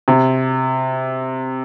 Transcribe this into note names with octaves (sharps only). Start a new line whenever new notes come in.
C3